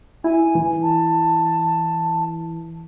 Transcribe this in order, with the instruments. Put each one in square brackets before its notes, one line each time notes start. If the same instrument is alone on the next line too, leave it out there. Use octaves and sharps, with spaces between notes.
[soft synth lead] E4 [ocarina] G#5
[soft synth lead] E3
[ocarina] A5